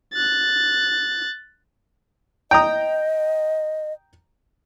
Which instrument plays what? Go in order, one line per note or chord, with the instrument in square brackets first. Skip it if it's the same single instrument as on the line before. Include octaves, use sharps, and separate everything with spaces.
[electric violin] F#6 A6
[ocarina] D#5 [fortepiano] G5 A#5 D#6